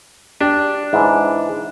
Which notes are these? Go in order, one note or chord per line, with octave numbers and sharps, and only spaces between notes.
D4 G4
G#2 E3 E4